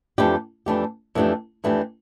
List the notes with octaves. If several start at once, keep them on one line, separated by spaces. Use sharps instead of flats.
F2 E3 A3 D4 G4
F2 E3 A3 D4 G4
F2 E3 A3 D4 G4
F2 E3 A3 D4 G4